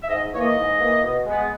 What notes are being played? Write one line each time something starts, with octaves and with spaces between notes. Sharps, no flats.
E5
G#2 D#5
E3 A#3 C#5
D#5
G#2
E3 A#3
B2
G#3 B3